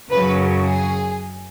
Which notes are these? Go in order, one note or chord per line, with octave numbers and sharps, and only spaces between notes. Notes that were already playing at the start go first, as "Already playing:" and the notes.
F#2 C#3 F#3 B4
G#4